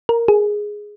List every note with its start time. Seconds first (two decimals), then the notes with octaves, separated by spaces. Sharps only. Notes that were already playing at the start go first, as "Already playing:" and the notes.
0.09 A#4
0.28 G#4